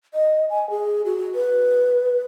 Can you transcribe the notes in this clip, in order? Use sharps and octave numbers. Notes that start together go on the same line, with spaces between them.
D#5
G#5
G#4
F#4
B4